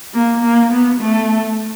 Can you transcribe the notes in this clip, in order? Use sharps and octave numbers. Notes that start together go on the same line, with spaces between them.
A#3
A#3
B3
A3